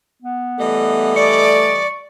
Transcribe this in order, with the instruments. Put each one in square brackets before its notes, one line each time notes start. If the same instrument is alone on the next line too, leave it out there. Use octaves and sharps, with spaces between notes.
[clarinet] B3
[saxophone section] E3 G3 D#5 [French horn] A3
[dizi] D5 [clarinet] C#6